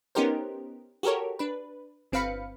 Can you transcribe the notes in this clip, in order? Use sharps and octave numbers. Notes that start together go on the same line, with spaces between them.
B3 C#4 D#4 G4 A#4 C5
F#4 G4 A4 A#4 C#5
D4 B4
G1 C4 B4 F5 B5 C#7